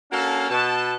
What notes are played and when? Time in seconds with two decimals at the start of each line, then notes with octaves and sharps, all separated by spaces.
0.11 A#3 C#4 D4 F#4 A4 F5
0.49 B2 A5